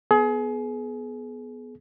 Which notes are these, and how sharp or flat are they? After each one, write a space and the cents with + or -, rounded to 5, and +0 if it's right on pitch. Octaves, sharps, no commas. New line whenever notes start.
B3 +0 G#4 +30